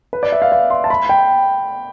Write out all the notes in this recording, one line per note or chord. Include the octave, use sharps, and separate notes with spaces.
B4
D5
E5
F5
F5
C6
A5
B5
G5